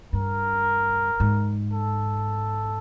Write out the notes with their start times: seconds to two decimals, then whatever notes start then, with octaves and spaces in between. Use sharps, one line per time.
0.13 G2 A#4
1.20 G#2
1.73 A4